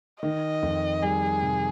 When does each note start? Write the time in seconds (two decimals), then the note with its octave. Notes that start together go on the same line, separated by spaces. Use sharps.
0.23 D#3 D#5
0.63 F2
1.02 G3 G#4
1.42 C3